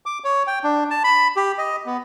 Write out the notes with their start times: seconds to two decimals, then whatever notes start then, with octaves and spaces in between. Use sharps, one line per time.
0.06 D6
0.24 C#5
0.47 G5
0.64 D4
0.90 A5
1.04 B5
1.36 G4
1.58 D#5
1.86 B3